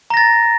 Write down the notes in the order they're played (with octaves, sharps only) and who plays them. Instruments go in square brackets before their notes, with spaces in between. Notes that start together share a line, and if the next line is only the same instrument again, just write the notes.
[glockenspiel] A#5
A#6
A6